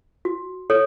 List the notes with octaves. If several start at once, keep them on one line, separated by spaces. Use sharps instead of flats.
F#4
A4 C#5